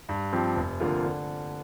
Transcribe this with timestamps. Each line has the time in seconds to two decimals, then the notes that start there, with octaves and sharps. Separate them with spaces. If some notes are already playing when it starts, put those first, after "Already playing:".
0.09 G2
0.33 F3 C4 G4
0.56 F1
0.80 F2 D3 A#3 F4
1.04 D3